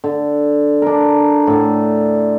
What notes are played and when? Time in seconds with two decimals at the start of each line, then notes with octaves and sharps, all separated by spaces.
0.04 D3
0.82 D4 A#4
1.47 A2 D3